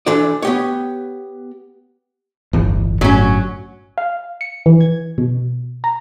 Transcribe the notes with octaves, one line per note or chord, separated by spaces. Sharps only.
E3 D4 A4 C5 D5
B3 G4 C#5
D1 G1 E2
G1 A2 F#3 C#4
F5
C#7
E3
G#6
B2
A#5